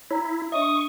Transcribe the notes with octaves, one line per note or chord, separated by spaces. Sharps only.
E4 C#5 A#5
D4 C#5 D#5 E5 C#6 D#6